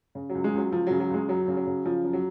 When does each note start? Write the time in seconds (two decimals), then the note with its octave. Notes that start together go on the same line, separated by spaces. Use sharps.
0.15 C#3
0.30 F#3
0.35 C#2
0.44 G#3
0.53 C#2 F#3
0.72 C#2 F3
0.87 C#3 F#3
1.00 F#3
1.10 C#2 G#3
1.28 F#2 F#3
1.48 C#3
1.57 F#3
1.67 C#3
1.85 C#3 F3
2.04 F#2
2.13 F#3